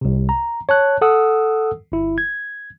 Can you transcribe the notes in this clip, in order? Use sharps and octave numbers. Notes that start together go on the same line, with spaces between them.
C2 C3
A#5
C#5 A5 F#6
A4 F#5 D#6 E6
G1 E4
G#6